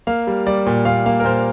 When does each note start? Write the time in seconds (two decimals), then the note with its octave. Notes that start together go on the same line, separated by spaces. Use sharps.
0.07 A#3 F5
0.27 G3
0.46 G3 D5
0.66 A#2
0.85 A#2 F5
1.06 A#3 F5
1.20 A#4
1.24 A#2 C5